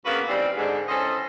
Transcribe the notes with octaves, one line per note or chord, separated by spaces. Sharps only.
D2 C#3 A#3 B3 F#4 B4
D#3 E3 G3 C4
G#2 D3
D#3 E3 C#4 A4 C5 D#5